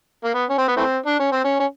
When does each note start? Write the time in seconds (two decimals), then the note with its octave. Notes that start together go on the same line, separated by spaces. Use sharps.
0.24 A#3
0.34 B3
0.49 C#4
0.58 C4
0.68 B3
0.77 E3 A3 C4
1.06 D4
1.19 C#4
1.32 C4
1.44 C#4
1.60 C#4